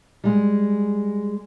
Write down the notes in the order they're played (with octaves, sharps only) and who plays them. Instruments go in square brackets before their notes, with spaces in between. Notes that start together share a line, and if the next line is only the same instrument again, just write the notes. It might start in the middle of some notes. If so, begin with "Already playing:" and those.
[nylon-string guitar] G3 G#3